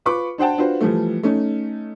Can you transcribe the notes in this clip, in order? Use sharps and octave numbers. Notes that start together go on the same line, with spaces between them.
F4 B4 B5 C#6 D6
D4 C5 F#5 G5 A5
D4 F4 F#4 B4 C5
E3 F3 G3 A3
A3 C#4 D#4